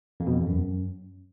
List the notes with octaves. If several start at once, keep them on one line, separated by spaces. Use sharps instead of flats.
F2
B2
F2
E2
F#2